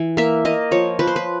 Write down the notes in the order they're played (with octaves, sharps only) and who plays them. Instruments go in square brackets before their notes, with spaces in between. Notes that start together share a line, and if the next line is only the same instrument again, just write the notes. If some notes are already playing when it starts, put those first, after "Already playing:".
Already playing: [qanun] E3
A#3 E5
A#3 D#5
F3 C#5
F3 B4
C5
B4